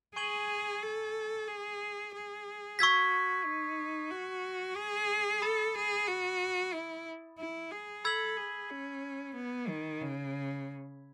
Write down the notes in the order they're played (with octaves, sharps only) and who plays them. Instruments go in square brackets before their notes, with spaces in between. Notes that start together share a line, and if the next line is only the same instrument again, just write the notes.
[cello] G#4 [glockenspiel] G#5 C#6 G#6 D#7 F#7
[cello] A4
G#4
G#4
[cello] F#4 [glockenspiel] C#6 E6 G#6 B6
[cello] D#4
F#4
G#4
[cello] A4 [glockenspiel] B5 D#6 A6 E7
[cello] G#4
F#4
E4
E4
G#4
[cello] A4 [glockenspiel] B5 E6 G#6 B6 F#7
[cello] G#4
C#4
B3
D#3
C#3